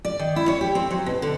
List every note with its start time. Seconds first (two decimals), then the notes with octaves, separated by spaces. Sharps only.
0.05 D5
0.19 D#3
0.36 E4
0.48 C#5
0.61 G4
0.75 C4
0.91 F#3
1.06 B2
1.22 D3